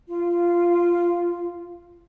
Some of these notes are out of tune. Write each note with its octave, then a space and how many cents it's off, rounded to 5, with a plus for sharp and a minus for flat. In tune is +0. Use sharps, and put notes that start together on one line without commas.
F4 -10